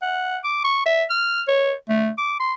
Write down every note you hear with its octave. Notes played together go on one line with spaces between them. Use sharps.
F#5
D6
C#6
E5
F6
C#5
A3
D6
C6